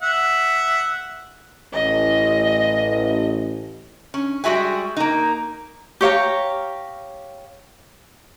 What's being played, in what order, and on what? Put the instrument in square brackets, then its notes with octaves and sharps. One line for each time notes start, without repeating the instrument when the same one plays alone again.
[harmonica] E5 F#5
[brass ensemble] A1 [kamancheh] D#5
[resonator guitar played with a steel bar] C#4
G3 G#3 F#4 E5 G#5
A#3 D#4
[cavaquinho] G4 C#5 F5 A#5